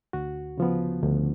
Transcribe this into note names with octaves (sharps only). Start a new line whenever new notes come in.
D2 F#4
C#3 F3 B3
D2